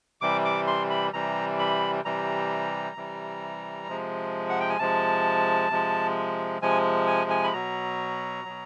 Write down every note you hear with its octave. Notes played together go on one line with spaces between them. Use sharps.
C3 E3 G3 D6
D6
C6
B5
C3 E3 G3 A#5
B5
C3 E3 G3 A#5
C3 E3 G3
C3 F3 G#3
F#5
G5
G#5
C3 F3 G#3 A5
C3 F3 G#3
C3 F3 G#3 G#5
G#5
G#5
B5
B2 F#3 A#5
B2 F#3